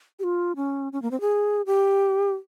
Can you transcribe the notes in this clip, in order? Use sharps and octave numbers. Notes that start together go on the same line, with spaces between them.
G4
F4
C#4
C#4
A#3
C4
G#4
G4